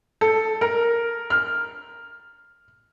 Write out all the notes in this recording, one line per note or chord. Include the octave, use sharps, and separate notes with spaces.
A4
A#4
F6